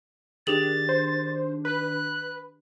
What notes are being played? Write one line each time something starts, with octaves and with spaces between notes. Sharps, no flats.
D#3 D4 G4 G#4 A6 F#7
C5
B4 F#6